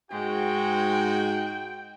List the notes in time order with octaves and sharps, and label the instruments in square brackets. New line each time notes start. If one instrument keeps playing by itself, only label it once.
[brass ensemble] G#2 F#4 [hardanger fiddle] G#3 [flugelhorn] G5